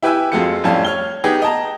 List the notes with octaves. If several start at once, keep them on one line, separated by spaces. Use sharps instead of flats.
E4 G4 B4 E5 G#5 E6
F2 G#3 F4 F#4 A4 C#7
F2 A2 G3 C#4 F5 A5
C#5 F6 G7
B3 D#4 G4 G#4
D#5 G5 A5 A#5